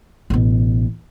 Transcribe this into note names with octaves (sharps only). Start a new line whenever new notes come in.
A1 B2